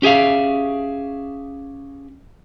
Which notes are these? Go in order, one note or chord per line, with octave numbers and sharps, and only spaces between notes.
C#4 G4 G#4 E5 F5